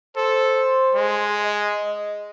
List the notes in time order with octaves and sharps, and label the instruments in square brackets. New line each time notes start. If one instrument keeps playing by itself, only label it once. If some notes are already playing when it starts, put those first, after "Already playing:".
[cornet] A4 [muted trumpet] C5
[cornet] G#3
[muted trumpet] D#5